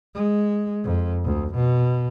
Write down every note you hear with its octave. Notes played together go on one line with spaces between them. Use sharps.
G#3
F2
D2
B2